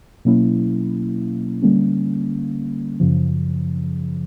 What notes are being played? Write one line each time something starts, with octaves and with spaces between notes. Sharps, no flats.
B2 F#3 A#3 C#4 E4
D3 G3 A#3 C#4
F#2 C#3 F3